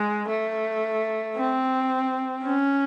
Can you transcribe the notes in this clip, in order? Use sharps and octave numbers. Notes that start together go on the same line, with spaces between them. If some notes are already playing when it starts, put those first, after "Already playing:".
Already playing: G#3
A3
C4
C#4